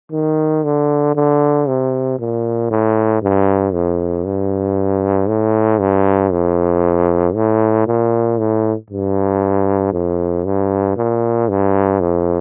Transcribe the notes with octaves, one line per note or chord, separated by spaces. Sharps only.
D#3
D3
D3
C3
A#2
A2
G2
F2
G2
A2
G2
F2
A2
A#2
A2
G2
F2
G2
A#2
G2
F2